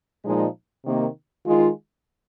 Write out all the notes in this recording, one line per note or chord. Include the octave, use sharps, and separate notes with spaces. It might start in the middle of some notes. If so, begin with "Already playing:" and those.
A#2 F3 G#3 D#4
C3 D#3 A#3 D#4
D#3 G#3 F4